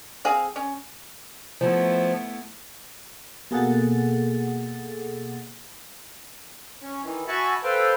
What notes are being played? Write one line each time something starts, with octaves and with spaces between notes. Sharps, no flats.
C4 G#4 F5
C#4
F3 A3 B3 E4
B2 A#3 G#4 A4 F#5 A6
C#4
D#3 E3
F#4 E5 G#5 A5 B5 C#6
A4 B4 C5 F5 G5